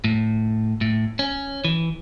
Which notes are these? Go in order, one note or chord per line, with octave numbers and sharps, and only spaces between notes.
A2
A2
C#4
E3